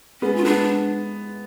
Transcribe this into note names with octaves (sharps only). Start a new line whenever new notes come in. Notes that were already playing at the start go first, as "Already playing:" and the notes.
G#3 B3 C#4
F4
G#3 B3 D4